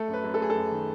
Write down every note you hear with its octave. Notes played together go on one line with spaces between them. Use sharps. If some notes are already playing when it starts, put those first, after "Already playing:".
Already playing: A3 A4
F#2
B4
F#2
A4
A3 G#4
A4
F#2
D#3